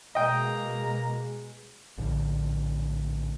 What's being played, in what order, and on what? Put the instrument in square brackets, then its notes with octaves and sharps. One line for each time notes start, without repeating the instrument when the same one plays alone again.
[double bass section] B2 G#3 [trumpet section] A#3 A#5 [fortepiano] D#5 G5
[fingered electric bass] A#1 A2 D3